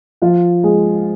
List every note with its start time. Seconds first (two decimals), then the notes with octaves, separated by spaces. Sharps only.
0.22 F3 F4
0.63 G#3 G#4